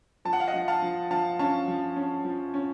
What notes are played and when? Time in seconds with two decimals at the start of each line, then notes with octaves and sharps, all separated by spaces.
0.25 F3 A5
0.33 F#5
0.40 F5
0.48 D#5 F#5
0.54 F3
0.68 F5 A5
0.82 F3
1.11 F3 F5 A5
1.39 C#4 F5 A5
1.68 F3
1.96 C#4
2.25 F3
2.54 C#4